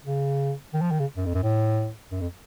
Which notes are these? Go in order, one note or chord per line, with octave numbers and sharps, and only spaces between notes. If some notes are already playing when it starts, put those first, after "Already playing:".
C#3
D#3
F3
D#3
C#3
F#2
F2
F#2
A2
F#2
F2